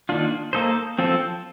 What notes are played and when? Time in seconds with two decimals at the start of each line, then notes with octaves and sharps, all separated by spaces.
0.09 D#3 A#3 D4 F4
0.53 A#3 D#4 A4 C5
0.99 F3 C4 F4 A4